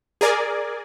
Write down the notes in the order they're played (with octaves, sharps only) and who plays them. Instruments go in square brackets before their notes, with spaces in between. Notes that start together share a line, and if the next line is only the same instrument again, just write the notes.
[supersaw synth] G#4 A#4 D5 G#5